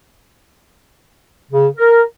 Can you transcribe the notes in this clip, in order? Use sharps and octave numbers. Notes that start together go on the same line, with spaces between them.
C#3
A#4